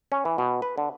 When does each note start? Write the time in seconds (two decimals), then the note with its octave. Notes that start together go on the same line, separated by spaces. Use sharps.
0.12 C#4
0.25 E3
0.38 B2
0.62 B4
0.78 D3